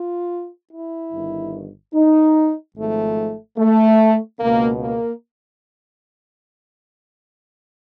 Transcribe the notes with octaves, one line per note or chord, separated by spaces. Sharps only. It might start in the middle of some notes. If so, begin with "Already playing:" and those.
Already playing: F4
E4
G1 G2 D#3
D#4
G#1 G#2 F3 A3
A3
C#2 B2 A#3
A#3